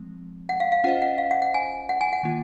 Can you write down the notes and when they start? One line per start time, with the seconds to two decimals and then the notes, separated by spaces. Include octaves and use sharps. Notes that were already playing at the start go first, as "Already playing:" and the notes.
Already playing: F3 G#3 C4
0.49 F#5
0.60 F5
0.72 F5
0.84 C#4 F4 C5 D#5 F#5
1.02 F#5
1.18 F5
1.31 F#5
1.42 F#5
1.54 G#5
1.89 F#5
2.01 G#5
2.13 F#5
2.23 D#3 A#3 F4